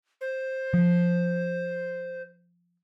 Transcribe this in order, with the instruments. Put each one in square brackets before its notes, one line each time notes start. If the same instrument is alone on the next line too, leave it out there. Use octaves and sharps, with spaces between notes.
[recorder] C5
[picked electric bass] F3